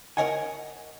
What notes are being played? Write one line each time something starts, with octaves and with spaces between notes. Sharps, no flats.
A#4 B4 C#5 D#5 F#5 G#5